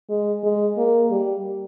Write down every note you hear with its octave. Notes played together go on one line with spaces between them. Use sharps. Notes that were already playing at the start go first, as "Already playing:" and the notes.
G#3
G#3
A#3
G3